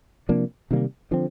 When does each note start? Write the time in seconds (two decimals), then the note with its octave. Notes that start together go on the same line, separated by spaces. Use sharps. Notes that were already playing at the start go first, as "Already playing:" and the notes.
0.29 C3 F3 A#3 D4
0.71 C3 D#3 G3 A#3
1.11 D3 F3 C4